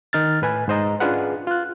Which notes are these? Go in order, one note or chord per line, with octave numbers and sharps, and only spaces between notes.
D#3 D#4 F6 A6
A2 B4 G#5
G#2 C5 D#5 A#5
C#4 D4 F4 G#4 B4 F#5
F4 F#6